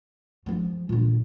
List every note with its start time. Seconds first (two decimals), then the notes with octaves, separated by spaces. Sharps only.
0.46 F3 G#3
0.89 A#2 D3